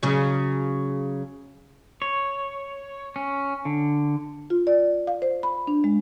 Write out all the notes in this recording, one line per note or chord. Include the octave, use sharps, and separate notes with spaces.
C#3 F#3
C#5
C#4
D3
F4
D5
F5
C5
B5
D4
G#3